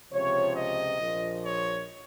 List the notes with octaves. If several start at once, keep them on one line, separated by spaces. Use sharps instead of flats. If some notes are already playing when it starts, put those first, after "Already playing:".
C#2 C3 F3 C#5
D#5
A#1 A#2 F3
C#5